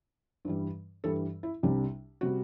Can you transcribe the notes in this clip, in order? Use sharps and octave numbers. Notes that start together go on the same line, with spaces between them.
G2 E3 G3
G2 E3 G3 A4
E4
C2 C3 G3 D4
C3 G3 F#4